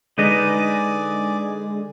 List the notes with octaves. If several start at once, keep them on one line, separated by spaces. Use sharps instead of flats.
D3 G#3 D#4 G#4 B4 D5 D#5